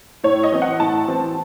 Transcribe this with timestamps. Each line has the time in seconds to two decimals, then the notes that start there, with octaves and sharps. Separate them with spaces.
0.23 A2 C#5
0.43 D#5
0.52 E3 C4
0.62 F#5
0.80 A2 A5
1.08 E3 C4